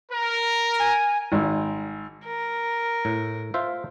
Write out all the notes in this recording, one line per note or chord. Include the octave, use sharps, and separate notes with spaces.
A#4
G#5
G#1
A#4
A2
F4 C5 E5